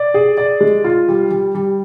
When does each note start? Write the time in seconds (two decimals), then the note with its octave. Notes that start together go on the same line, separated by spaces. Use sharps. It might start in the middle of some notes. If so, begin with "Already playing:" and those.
Already playing: D5
0.14 G#4
0.37 D5
0.60 G#3
0.84 F4
1.08 G3
1.31 G3
1.55 G3